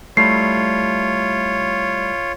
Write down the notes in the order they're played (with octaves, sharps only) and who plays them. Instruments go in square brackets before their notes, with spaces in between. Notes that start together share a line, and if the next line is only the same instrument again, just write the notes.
[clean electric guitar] G3 A3 E4 [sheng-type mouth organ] F4 C#5 [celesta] C7